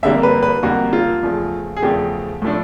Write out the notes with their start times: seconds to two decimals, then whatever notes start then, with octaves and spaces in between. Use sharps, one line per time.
0.03 F2 D3 G3 A#3 E5
0.23 B4
0.43 B4
0.63 F2 D3 G3 A#3 F#4
0.93 F4
1.23 E2 C#3 F3 A3
1.77 G#4
1.82 E2 C#3 F3 A3 G4
2.42 A2 F3 A3 D4